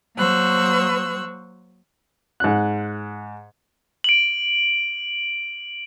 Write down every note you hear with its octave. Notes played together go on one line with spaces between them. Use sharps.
F#3 A#3 C5 C#6 E6 F#6
G#2 F#6
D7 F#7